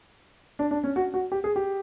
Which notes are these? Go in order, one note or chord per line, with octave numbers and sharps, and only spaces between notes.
D4
D4
C#4
F#4
F#4
G4
G#4
G4